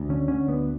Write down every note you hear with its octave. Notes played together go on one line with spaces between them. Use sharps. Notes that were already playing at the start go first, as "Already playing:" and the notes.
Already playing: D2
D3 C#4
D3 C#4
D2 B3